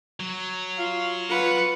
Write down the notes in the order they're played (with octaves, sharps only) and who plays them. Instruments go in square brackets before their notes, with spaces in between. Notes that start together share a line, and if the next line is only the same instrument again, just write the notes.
[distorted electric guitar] F#3
[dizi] F4 [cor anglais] F5
[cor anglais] B3 [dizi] F4 [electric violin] B4 C#7